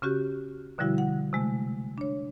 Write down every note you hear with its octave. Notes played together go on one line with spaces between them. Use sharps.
C#3 C#4 F#4 G4
B2 D3 F3 G3 E4 F#4
F#5
C3 G#3 A3
D4 C#5